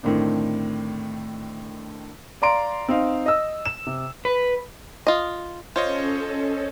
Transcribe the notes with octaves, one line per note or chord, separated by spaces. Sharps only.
A2 D3 D#3 C4 D4
D5 F5 A#5 C6 D7
C4 D#4 F5
D#5 E6
E7
C3
B4
F4 D#5
C#4 F4 A4 C5 C#5 D#5